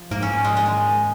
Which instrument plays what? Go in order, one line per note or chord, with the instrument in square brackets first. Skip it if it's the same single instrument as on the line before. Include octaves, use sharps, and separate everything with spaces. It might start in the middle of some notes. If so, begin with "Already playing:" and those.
Already playing: [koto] F3
[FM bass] G#2 [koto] A#3
[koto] C#4
G#3
G#3
D#3